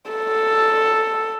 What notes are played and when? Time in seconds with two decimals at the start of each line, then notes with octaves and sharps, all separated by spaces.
0.11 A4